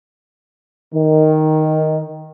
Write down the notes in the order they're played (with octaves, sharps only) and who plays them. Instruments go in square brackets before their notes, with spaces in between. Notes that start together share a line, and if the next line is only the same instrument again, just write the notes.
[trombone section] D#3